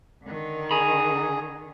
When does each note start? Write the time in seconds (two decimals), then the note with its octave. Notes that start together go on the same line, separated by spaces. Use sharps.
0.25 D3 D#3
0.71 G#4 G#5 A#5 B5